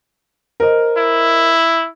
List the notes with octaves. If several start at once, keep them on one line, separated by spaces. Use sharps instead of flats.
A#4 C5 D#5
E4